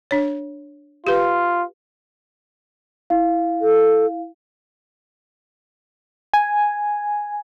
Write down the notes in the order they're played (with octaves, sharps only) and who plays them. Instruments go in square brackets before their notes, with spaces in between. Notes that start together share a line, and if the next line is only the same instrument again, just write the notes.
[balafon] D4 C#5
[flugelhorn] F4 [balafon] G4 B4
[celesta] E4 F5
[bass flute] A4
[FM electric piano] G#5